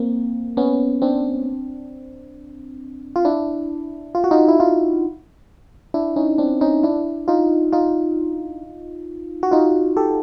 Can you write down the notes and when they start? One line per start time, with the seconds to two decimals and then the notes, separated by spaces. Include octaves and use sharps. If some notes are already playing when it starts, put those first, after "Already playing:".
Already playing: A#3 C4
0.57 B3 C#4
1.02 C4 D4
3.16 F4
3.25 D4 E4
4.15 F4
4.24 F#4
4.31 D#4 F4
4.48 E4
4.60 D#4 F4
5.94 D4 E4
6.16 C#4 D#4
6.38 C4 D4
6.61 C#4 D#4
6.83 D4 E4
7.28 D#4 F4
7.73 D#4 F4
9.43 F#4
9.51 D#4 F4
9.97 G4 A4